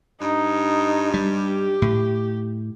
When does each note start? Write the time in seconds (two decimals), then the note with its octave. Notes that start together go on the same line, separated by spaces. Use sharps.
0.21 G2 D#4
1.14 G3 G4
1.82 A2